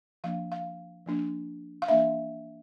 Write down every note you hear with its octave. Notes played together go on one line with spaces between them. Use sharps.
F3 A#3 D4 F5
F5
F3 A#3 D4
F5
E3 A#3 D4 E5